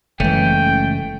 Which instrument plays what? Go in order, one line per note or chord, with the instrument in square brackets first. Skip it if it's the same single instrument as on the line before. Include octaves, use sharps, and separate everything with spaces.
[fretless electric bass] F#1 E3 [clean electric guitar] C#2 A3 C#4 [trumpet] G5